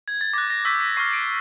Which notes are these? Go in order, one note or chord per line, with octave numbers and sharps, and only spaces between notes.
G#6
A6
D6 F#6 A#6
A#6
C#6 E6 G6 B6
B6
C#6 F6 C7
D7